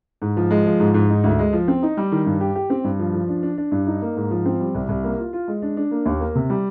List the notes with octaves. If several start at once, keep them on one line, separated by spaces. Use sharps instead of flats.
G#2
F3
G#3
F3
G#2
G#2
D#4
D2
G#3
F3
C4
D#4
G3
D#3
G2
G4
G4
C4
G2
F3
F3
D4
D4
D4
G2
D#4
A#3
G#2
F3
C4
G3
C2
C2
A#3
F4
F4
G#3
D4
D4
A#3
D#2
A#3
C3
G3